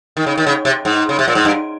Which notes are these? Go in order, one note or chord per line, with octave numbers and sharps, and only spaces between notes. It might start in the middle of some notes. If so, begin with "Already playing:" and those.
D#3
C#3
D#3
C#3
C3
G#2
C#3
C3
A#2
G#2
G2